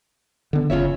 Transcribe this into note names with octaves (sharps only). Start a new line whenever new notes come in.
D3 B3
F#1 C#3 F4 C#5 E5